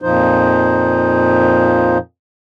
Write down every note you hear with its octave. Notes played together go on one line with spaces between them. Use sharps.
F2 A#2 F3 D#4 C5